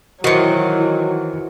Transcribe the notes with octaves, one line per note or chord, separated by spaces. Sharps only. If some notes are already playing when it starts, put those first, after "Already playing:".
D#3 E3 F#3 E4 F#4 C5 C#7